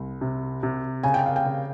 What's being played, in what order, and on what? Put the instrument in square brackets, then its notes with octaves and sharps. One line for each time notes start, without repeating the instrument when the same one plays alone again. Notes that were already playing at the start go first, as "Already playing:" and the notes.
Already playing: [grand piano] C2
C3
C3
[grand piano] C#3 [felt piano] G#5
[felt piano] G5
F5
G5
[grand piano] C#3